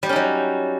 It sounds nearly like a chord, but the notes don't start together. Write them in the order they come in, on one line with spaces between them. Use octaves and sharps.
G3 G4 C#4 D#4 F#3